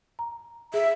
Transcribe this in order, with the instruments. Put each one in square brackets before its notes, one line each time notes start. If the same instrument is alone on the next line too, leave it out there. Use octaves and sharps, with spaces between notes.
[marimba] A#5
[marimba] G#4 [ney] E5